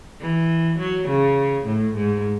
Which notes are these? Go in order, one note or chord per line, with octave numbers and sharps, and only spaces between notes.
E3
F#3
C#3
A2
G#2